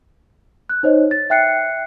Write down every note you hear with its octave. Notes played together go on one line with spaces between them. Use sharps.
F#6
D#4 C5 C#5 D#5
A6
E5 G5 F#6 C7 C#7